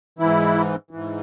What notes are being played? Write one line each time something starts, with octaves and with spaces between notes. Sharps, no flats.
G#2 E3 E4
G#2 E3